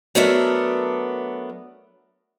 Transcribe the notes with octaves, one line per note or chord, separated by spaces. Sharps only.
F#3 A3 B3 D4 A#4 E5